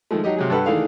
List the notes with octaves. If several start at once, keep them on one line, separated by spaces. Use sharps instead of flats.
D#3 F3 G#3 A3
F#3 D#4 G4 D#5
C3 F#3 G#4
G2 G4 A4 B4 F#5
D#3 E3 A3 D4 G#4 F5